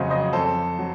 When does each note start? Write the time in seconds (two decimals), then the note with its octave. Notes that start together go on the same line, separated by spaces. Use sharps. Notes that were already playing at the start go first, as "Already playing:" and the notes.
Already playing: F2 C#3 F#3 C5 C#5 D#5 F5
0.10 C5 D#5
0.33 F2 A4 C5
0.79 F#3